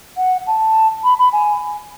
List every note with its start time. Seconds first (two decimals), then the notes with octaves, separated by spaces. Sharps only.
0.17 F#5
0.46 A5
1.03 B5
1.18 B5
1.32 G#5